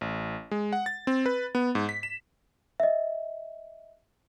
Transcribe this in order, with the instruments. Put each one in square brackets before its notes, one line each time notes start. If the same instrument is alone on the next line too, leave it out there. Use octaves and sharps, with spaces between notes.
[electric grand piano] A1
G#3
F#5
A6
C4
B4
B3
G#2
B6
E7
[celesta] D#5 E5